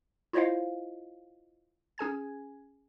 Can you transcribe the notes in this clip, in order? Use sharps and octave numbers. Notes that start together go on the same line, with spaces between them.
E4 F4 C5 C#5 D#5 F5
C#4 G#4 G#5 G#6